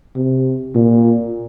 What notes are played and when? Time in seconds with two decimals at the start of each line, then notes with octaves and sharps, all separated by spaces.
0.16 C3
0.75 A#2